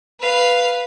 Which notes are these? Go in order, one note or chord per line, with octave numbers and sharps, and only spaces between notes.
B4 F5